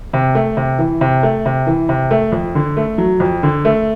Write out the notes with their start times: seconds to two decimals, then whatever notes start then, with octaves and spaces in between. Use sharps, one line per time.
0.13 C3
0.35 A3
0.57 C3
0.79 E3
1.01 C3
1.23 A3
1.46 C3
1.67 E3
1.89 C3
2.11 A3
2.32 F2
2.55 D3
2.77 A3
2.98 F#3
3.20 F2
3.43 D3
3.65 A3